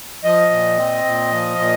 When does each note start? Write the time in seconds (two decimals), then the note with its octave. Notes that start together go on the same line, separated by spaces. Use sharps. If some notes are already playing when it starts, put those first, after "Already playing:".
0.24 F3 D#5
0.50 A#2
0.78 C4
1.05 A#2
1.32 F3
1.58 A#2